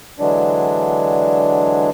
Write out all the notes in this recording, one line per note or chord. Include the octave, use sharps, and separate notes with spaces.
D3 E3 F#3 G#3 D4